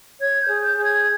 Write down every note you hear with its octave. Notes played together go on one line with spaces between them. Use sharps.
C#5 G#6
G6
G#4
G6
G#4
G#6